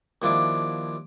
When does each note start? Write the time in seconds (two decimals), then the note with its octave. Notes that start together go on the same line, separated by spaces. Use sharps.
0.22 D#2 F3 D4 E4 D6